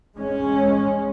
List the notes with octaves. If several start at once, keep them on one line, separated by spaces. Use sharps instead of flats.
G#3 C#4